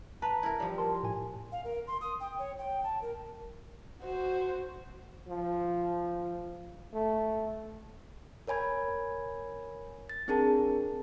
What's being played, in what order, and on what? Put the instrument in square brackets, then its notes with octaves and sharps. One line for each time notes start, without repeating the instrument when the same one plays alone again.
[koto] B4 [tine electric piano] A5 A#5
[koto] E4 A#4
F3 G3
[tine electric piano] A#4 A5 C6
A2 G#5
[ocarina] F5
A#4
C6
D#6
G5
C#5
G5
A5
A#4
[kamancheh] F#4 C5
[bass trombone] F3
A3
[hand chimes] A#4 C#5 G#5 B5 G#6
A6
C4 D4 G#4 A#4 A5